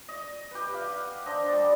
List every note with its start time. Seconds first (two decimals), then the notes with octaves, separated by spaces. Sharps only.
0.08 D#5
0.51 G4 B4
0.74 F5
0.90 F#5
1.26 D4 C5 D#5 A#5
1.49 G3 D5